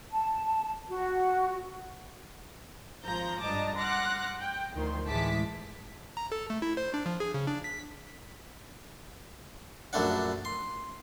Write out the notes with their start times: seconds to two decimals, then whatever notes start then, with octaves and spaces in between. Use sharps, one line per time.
0.12 A5
0.89 F#4
3.03 G#1 F3 A#5 G6
3.41 G2 D4 D#5 A5 A#5 D6
3.77 F#5 C6 D6 F6 F#6 A#6
4.40 G5
4.74 D2 D#3 F3 C6
5.07 A1 E3 G#3 A5 D6 B6
6.17 A#5
6.32 A4
6.50 A3
6.62 E4
6.77 C5
6.94 D4
7.06 F3
7.20 G#4
7.34 C#3
7.47 D4
7.64 B6
9.93 A#1 F#2 A3 D4 F#5
10.45 C6